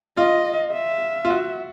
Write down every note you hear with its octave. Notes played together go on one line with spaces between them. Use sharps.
F4 D#5
E5
F4
F#4